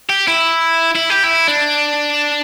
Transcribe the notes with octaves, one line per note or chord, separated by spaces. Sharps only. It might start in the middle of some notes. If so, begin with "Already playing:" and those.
G4
E4
E4
G4
E4
D4